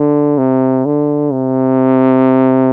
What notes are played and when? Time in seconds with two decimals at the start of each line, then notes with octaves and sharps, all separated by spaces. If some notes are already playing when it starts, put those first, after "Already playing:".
Already playing: D3
0.38 C3
0.86 D3
1.32 C3